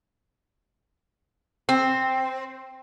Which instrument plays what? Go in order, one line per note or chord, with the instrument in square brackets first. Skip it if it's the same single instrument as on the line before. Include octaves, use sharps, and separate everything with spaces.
[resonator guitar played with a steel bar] C4